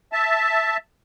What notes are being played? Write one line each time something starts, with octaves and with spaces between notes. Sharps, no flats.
E5 A5